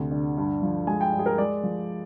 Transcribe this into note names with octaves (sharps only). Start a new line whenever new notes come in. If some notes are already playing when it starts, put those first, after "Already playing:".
Already playing: D2 C3
D3
G2
F3
G#3 G#5
G5
G2
G#4
A#4
G#3 D5
F3